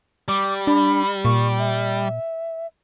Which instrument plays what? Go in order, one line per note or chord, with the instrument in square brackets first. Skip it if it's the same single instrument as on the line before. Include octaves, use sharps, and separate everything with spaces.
[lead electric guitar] G3 [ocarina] D6
[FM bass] D4 [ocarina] B5
[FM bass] A#2 [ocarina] C#6
[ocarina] E5